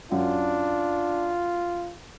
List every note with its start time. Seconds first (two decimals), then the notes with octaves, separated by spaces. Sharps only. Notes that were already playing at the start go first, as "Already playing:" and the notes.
0.12 F#2 D4 F4